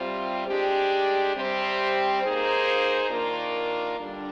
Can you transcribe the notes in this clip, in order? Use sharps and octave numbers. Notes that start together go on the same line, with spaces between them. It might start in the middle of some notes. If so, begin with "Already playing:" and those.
Already playing: C3 G3 C4 F4 C5
G#3 D4 G4
C3 G3 C4 G4 C5
A#3 D#4 G#4 C5
D#3 A#3 D4 F4 A#4
D3 G3 D4